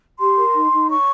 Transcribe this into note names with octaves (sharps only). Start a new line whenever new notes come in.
G4 C6
A#4
D#4
D#4
C#5 C#6